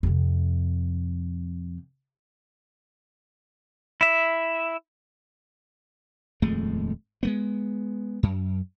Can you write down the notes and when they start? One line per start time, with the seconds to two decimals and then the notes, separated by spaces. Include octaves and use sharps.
0.03 F2 C3
4.01 E4 E5
6.42 D#1 F2 G#3 A3
7.23 G#3 A3 B3
8.23 F#2